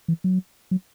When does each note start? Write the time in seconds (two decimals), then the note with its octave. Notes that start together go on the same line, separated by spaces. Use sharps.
0.08 E3
0.24 F#3
0.71 F#3